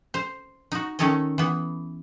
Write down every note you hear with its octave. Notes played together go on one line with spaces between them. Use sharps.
C5
D#4 F#4
D#3 A3 C#4 A4 C#5 D#5
E3 B3